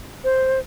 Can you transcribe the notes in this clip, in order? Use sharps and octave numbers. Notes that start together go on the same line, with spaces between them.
C5